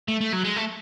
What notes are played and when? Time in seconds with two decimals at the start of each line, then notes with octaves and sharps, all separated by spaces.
0.08 A3
0.21 A3
0.33 F#3
0.44 G#3
0.56 A3